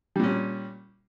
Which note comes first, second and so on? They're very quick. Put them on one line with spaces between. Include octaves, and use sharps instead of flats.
G3 A#2 C#4